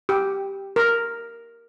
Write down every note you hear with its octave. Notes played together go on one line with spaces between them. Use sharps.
G4
A#4